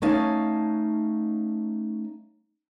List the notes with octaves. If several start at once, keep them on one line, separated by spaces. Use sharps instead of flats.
A3 C#4 D#4 C#5 F5 A5